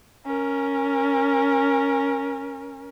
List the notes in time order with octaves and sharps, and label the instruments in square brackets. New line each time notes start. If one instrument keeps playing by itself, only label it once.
[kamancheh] C#4 A#4